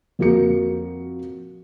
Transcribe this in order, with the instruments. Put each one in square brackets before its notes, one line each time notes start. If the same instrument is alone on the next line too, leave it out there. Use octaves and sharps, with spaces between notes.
[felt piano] F2 A#3 F#4 A#4 C#7